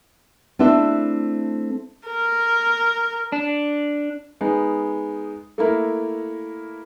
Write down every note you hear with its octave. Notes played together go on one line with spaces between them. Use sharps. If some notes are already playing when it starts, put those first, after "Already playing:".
A3 C4 D4 E4 A4
A#4
D4
G#3 B3 D#4
A3 A#3 E4 A#4